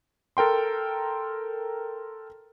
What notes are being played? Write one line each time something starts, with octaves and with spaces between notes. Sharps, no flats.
A4 A#4 G5 C6